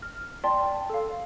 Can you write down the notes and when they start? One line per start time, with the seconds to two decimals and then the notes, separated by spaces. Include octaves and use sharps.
0.02 F6
0.44 D5 G5 A5 C6
0.90 A4 F5